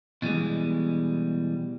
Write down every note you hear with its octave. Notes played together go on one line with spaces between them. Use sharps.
B2 E3 G3 G#3